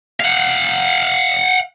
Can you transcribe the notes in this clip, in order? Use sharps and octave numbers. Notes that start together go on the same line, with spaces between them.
F5 F#5